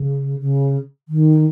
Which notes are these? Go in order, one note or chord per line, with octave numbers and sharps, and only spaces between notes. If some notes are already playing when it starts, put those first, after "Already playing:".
Already playing: C#3
C#3
D#3